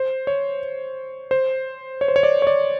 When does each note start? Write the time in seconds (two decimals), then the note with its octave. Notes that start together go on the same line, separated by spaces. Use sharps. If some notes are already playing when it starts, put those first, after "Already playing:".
Already playing: C5
0.27 C#5
1.31 C5
2.01 C#5
2.08 C5
2.16 C#5
2.23 D5
2.42 C#5
2.47 D5